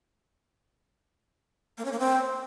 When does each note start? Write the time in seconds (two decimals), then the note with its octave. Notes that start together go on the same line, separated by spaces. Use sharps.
1.78 A#3
1.85 C#4
1.92 A#3
1.99 C4